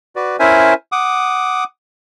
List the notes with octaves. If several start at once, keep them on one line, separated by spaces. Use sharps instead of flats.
F#4 B4 D5
C#4 E4 A#4 C5 E5 G#5
F#5 D6 D#6